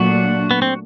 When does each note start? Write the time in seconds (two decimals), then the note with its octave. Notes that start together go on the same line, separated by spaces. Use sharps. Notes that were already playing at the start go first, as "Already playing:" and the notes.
Already playing: A#2 F#3 A3 D4 F#4
0.51 B3
0.62 C4